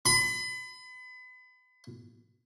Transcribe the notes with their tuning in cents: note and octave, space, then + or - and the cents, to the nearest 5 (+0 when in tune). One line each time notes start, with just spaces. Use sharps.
B5 +35